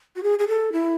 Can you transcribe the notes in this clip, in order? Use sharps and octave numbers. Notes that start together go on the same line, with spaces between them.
F#4
G#4
G#4
A4
E4